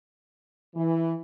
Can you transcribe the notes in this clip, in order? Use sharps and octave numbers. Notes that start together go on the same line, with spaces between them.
E3